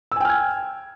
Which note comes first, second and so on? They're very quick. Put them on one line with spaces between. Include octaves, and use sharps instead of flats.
E6 G#5 G5 F6 G#6